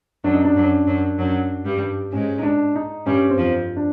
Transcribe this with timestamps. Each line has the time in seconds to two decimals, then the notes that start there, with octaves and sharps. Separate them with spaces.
0.24 F#2 F#3 D4
0.34 D#4
0.45 D4
0.56 F#2 F#3
0.87 F#2 F#3
1.18 F#2 F#3
1.65 G2 G3
2.12 G#2 G#3 C#4
2.39 D#4
2.43 D4
2.76 D#4
3.06 G2 G3 C#4
3.30 C4
3.38 F2 F3
3.77 D4